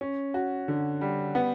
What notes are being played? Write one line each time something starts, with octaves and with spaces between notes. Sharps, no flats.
C#4
F#4
D3
G3
B3